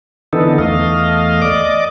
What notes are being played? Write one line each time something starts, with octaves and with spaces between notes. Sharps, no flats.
D3 E3 B3 D#4 A4
E2 A3 D#5 F5
D5 D#5 D6